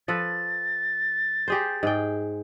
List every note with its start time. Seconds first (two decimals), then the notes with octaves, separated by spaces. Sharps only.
0.08 F3 A4 B4 A6
1.48 G4 G#4 C5
1.83 G#2 G#4 G5